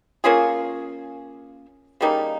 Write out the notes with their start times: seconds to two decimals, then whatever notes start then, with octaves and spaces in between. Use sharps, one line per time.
0.24 A#3 C#4 F4 G#4
2.01 C#3 G3 A#3 D#4